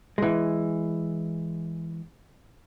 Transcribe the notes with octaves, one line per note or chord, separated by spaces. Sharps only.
E3 G#3